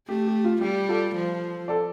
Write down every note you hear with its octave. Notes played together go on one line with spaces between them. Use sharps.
A3 G4
G4
F4
G3 G4
F4 A4
F3
A4 D5